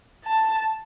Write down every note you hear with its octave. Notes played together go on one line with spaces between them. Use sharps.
A5